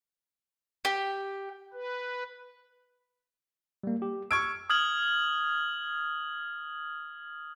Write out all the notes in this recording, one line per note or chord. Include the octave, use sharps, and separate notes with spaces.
G4
B4
G3 A#3
G4
C#6 E6 F6 G#6 D7
D#6 F6 G#6 F#7